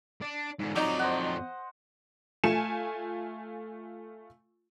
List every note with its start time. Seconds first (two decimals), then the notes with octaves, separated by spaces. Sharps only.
0.22 D4
0.60 G#2 D3
0.76 F2 F#3 D#4 D5
0.99 C5 D#5 F#5
2.44 A3 F4 G#5 C#7 E7